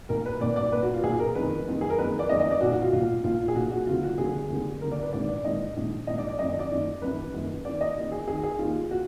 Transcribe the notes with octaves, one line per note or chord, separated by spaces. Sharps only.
B1 A#2 A#4
B4
B1 A#2 D5
D5
B1 A#2 B4
F#4
F4
B1 A#2 G#4
A#4
F#1 F2 D#3 B4
F#1 F2 D#3
G#4
A#4
F#1 F2 D#3 B4
D5
F#1 F2 D#3 D#5
D#5
D5
B1 A#2 F#4
F#4
F4
B1 A#2 F4
B1 A#2 F4
G#4
B1 A#2 F#4
F#4
F1 D#2 D3 F4
F#4
F1 D#2 D3 G#4
F1 D#2 D3
F1 D#2 D3 A#4
D5
B4
A#1 G#2 D#3 D5
D5
A#1 G#2 D#3 D#5
A#1 G#2 D#3
A#1 G#2 D#3 D#5
D5
D5
F#1 F#2 D#3 D#5
D#5
D5
F#1 F#2 D#3
F#1 F#2 D#3 B4
F#1 F#2 D#3
D#2 D#3 D5
D#5
D#2 D#3
G#4
D#2 D#3 G#4
G#4
D#2 D#3 F4
F#4